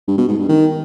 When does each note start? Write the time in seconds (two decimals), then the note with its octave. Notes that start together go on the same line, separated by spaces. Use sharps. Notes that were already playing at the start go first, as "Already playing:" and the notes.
0.08 G2
0.18 B2
0.28 G#2
0.39 G2
0.49 D#3